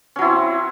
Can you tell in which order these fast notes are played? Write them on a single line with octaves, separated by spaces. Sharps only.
C#4 F#3 E4 C4